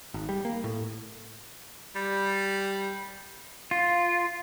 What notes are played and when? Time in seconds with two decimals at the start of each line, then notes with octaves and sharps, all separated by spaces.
0.14 G#1
0.29 G3
0.45 A#3
0.64 A2
1.96 G3
3.71 F4